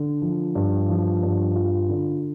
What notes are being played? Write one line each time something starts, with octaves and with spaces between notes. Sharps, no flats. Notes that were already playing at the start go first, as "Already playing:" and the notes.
Already playing: D3
F3
G2
F3
G2
F4
D3